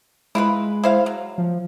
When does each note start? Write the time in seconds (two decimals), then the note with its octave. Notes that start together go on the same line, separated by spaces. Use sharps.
0.35 G#3 E4 F4 B4
0.84 E4 C5 F5
1.06 F#3
1.38 F3